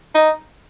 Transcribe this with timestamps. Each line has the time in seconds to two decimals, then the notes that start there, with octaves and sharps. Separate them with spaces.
0.15 D#4